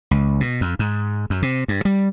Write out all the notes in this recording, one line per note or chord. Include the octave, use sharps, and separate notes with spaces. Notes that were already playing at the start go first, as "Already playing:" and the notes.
C#2
B2
F2
G#2
F#2
C3
G2
G3